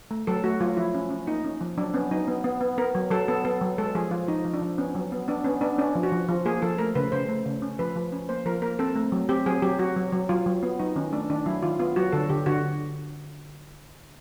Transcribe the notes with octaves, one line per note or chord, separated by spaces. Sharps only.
A3
F#3 A4
A3 F#4
F#3 F4
F3 E4
C#4
C#4
A#3 D#4
C#4
F3
F#3 D4
B3 C#4
F#3 D#4
B3
B3
B3
B3 A#4
F#3
F#3 A4
B3 A4
B3 A4
F#3
G#3 A4
F3 G#4
F3 F4
F3 D#4
F3
D4
F3
B3 C#4
F#3
B3
B3 D4
B3 C#4
B3 D4
C#4 D4
F3
F#4
F3
F3
A#3 G#4
F3 A4
A3 A#4
C#3 B4
C#3 C5
A3
C#3
C#4
F3 B4
F3
C#4
A#3 C5
F3 A#4
A#3 A#4
C4 A4
A3
F#3
C4 G4
F#3 G#4
F#3 G4
F#3 F#4
F#3
F#3
F#3 F4
F#3
B3
F#3 D#4
D#3 C#4
A3 D4
D#3 D4
F#3 E4
D#3 F4
B3 F4
F#3 F#4
D3 A4
D3 G4
D3 F#4